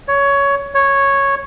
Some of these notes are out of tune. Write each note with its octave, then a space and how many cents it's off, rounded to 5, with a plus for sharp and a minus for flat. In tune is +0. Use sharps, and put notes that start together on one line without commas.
C#5 +15
C#5 -5